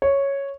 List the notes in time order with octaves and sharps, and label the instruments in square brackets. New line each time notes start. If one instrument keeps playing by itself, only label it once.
[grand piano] C#5